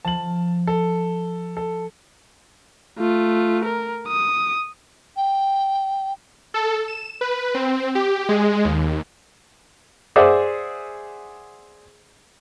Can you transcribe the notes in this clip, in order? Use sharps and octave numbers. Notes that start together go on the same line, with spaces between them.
F3 A5 F#7
A4
A4
A3 F4
A#4
D#6
G5
A4
E7
B4
C4
G4
G#3
D#2
G#4 C5 D5 E5 F#5